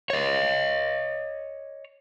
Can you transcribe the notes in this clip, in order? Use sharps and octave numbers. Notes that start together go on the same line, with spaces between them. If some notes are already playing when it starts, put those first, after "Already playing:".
C#5 D#5